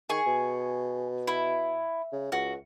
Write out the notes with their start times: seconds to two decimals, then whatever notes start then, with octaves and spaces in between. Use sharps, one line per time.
0.09 D#3 G#4 G#5 C#6
0.26 B2
1.27 E4
2.12 C#3
2.32 C#2 F#4